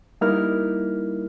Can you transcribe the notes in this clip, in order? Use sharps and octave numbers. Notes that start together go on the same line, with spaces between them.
G3 A#3 D#4 E4 A#4 F6